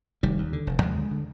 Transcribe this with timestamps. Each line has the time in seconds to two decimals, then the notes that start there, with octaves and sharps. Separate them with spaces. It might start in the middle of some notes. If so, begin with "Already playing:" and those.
0.23 F1 D#3 G3
0.38 D#2
0.53 D3
0.67 F1
0.81 D#2 F3 G#3
0.96 D3
1.11 D3